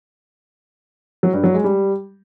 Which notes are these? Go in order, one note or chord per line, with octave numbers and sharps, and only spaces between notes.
F#3
G2
F#3
G#3
G3